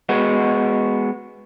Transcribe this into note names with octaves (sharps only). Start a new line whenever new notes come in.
G#3 B3 F#4